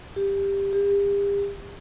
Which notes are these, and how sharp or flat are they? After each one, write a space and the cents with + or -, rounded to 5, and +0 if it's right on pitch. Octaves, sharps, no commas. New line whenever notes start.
G4 +15
G4 +40